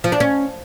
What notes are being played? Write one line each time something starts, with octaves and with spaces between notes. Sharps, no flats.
F3
D4
C#4